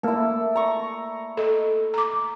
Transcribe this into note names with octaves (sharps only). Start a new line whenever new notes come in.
A3 A#3 E4 A4
A#5 C#6
A4 D#5
A#5 D6